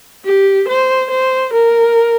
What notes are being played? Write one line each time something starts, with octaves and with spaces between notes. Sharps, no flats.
G4
C5
C5
A#4